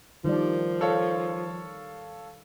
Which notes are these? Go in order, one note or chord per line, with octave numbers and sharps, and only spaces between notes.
D#3 F3 G3 D5
A4 C#5 F5